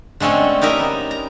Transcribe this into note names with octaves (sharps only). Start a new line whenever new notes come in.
D3 G#3 A3 C4 C#4
D#4 G4 A#4 D#5 E5
B3
A#5